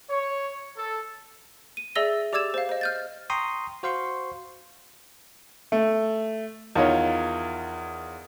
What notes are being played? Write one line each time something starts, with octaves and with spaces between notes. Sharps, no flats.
C#5
A4
D#7
G#4 D5 E5 E6 A#6 G7
G4 D5 D6 E6 G#6 E7
C5 F5
C5 D#5
F6 G6 A6
G5 A#5 C6 C#6 D#6
F#4 C5 F5 C6 C#6
A3
E2 D#3 F4 C#5 D#5